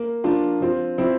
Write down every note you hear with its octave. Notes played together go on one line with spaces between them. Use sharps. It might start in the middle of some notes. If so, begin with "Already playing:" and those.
Already playing: A#3
F3 A#3 D4 F4
F3 C4 F4
F3 C4 E4